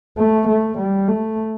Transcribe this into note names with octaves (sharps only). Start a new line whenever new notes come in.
A3
A3
G3
A3